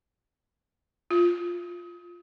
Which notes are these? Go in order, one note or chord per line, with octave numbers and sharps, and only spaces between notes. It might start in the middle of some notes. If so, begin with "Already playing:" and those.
F4